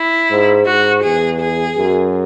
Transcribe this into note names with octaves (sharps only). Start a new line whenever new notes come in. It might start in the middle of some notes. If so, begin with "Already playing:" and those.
Already playing: E4
G#2
G#2 F#4
E2 G#4
G#4
F#2